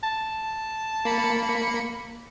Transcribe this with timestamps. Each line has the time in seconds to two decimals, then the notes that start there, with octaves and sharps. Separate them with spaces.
0.03 A5
1.05 A#3 B5 C#7